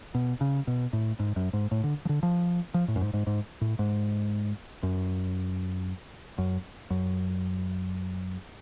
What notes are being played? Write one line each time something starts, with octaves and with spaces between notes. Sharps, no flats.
B2
C#3
B2
A2
G#2
F#2
G#2
A2
D3
F3
D3
F3
F3
A2
F#2
G#2
G#2
G#2
A2
G#2
F#2
F#2
F#2